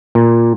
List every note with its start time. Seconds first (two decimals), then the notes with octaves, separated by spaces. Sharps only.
0.15 A#2